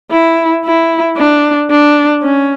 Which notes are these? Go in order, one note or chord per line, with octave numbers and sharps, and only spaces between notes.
E4
E4
D4
D4
C#4